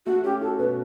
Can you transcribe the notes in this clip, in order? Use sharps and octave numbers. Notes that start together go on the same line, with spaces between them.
A3 F#4
C#4 G4
F#4 A4
B2 B4